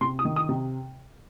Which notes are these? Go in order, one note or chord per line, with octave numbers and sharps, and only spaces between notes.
C3 C6
D#6
D#3
D#6
C3